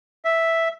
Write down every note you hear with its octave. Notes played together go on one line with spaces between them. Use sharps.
E5